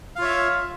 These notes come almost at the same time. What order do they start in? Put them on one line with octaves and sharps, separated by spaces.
F5 F4 C#5 E5